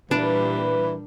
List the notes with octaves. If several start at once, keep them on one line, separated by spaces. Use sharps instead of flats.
A#2 E3 G3 D4 B4